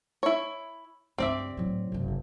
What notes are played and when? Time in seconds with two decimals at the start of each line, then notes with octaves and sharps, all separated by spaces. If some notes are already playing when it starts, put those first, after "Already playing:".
0.23 E4 C#5
1.18 C#2 G2 C4 D5 E5
1.57 A2 F#3
1.92 F#1 C2